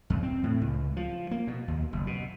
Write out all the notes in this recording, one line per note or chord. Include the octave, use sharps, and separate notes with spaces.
E2
C4
A2
C#2
F3
A#3
B2
D#2
F#1
B2